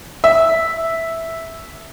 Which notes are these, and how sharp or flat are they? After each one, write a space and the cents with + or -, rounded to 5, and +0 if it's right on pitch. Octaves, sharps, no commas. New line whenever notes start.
E5 -5